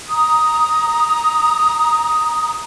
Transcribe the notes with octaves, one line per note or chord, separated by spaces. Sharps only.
A#5 D#6